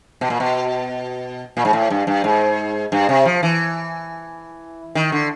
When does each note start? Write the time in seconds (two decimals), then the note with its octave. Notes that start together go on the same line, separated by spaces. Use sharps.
0.21 B2
0.30 A#2
0.40 B2
1.57 A#2
1.65 G#2
1.73 A2
1.90 G2
2.07 G2
2.24 G#2
2.92 G2
3.09 C3
3.25 F3
3.43 E3
4.95 D#3
5.12 D3